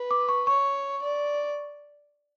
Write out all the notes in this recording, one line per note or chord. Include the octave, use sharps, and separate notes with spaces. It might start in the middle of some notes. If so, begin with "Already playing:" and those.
Already playing: B4
D6
C#6
C#5 C#6
D5